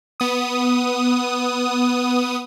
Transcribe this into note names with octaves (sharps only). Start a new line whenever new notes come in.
B3 D#6